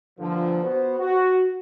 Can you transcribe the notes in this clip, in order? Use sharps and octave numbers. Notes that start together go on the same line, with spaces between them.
G2 A#2 D3 F3
B3 F#4 C5
F#4